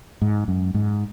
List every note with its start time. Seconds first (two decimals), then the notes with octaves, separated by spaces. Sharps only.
0.22 G#2
0.48 F#2
0.74 G#2